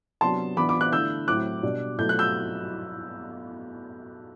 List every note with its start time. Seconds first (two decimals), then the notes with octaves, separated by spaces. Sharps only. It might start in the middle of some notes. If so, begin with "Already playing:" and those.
0.21 C3 F#3 B3 D4 A5 C6
0.57 E3 B3 D4 B5 D6
0.69 B5 D6
0.81 D6 F#6
0.92 D3 A3 E4 E6 G6
1.27 A2 F#3 C4 E4 D6 F#6
1.63 B2 G3 D4
1.98 B2 F#3 A3 E4 G6
2.09 F#6
2.19 E6 G6